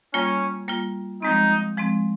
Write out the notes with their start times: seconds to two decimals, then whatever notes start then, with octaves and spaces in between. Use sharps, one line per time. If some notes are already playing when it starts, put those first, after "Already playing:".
0.14 G3 A#3 C#4 F4
0.68 G3 A#3 F4
1.22 F3 G#3 C4 D#4
1.78 F3 G#3 C4